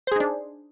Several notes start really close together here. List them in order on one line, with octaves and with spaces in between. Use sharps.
C5 G#4 D#4 D4